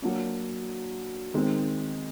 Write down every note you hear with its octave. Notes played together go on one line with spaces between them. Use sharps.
F#3 A#3 D4
D#3 G#3 C4